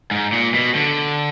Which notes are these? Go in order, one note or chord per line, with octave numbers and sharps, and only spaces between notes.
G#2
A#2
B2
D3